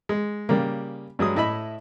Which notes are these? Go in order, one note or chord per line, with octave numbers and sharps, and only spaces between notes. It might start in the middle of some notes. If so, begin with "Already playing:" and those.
G#3
C#3 G3 A#3
G2 F#3 G#3 D#6
A2 E4 D#5 E5 B5